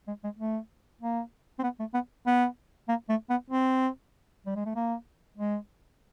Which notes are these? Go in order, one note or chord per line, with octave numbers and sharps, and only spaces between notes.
G#3
G#3
A3
A#3
C4
B3
A3
B3
B3
A#3
A3
B3
C4
G3
G#3
A3
A#3
G#3